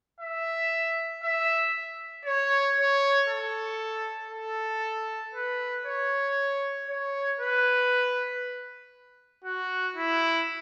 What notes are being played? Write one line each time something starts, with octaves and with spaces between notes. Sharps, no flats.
E5
E5
C#5
C#5
A4
A4
B4
C#5
C#5
B4
F#4
E4